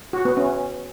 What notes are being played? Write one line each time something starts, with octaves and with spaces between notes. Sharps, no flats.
F#4
B3
C#4